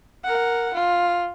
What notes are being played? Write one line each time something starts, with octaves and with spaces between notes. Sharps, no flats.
A#4 F#5
F4